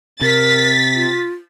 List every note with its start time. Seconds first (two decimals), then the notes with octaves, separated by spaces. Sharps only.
0.21 C3 A#4 A6 B6
0.95 F4